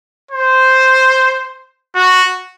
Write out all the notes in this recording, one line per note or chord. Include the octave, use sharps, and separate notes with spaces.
C5
F#4